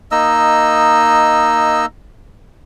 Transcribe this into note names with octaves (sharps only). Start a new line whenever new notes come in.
A#3 D#4 D#5 E6